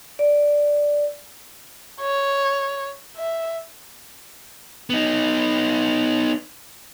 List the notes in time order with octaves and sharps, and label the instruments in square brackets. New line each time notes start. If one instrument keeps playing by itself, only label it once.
[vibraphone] D5
[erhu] C#5
E5
[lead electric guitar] B3 D#4